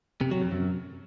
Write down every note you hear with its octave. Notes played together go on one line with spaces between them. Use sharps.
C3
F#3
F2
F#2